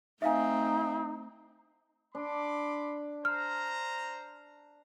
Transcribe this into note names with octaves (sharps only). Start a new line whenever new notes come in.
A3 C4 D#4 E5 F5 G#5
D4 B5 C6 D6
C5 A#5 F6